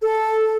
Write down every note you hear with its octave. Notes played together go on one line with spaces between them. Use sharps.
A4